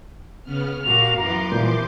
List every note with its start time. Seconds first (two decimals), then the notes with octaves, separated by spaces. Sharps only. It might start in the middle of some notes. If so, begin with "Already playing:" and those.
0.44 C#3 B3 F6
0.84 A#2 F#4 G4 F5 F7
1.18 F#2 E3 B3 A#5 C6 D6
1.52 A#2 E3 F3 G3 G6